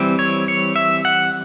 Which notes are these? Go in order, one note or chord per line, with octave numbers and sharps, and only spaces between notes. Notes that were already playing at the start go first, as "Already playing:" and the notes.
Already playing: E3 G3 C4
C#5
C#5
E5
F#5